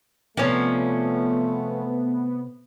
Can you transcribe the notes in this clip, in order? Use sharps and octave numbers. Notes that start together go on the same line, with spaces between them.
C3 F3 A3 B3 C#4 C#5 D5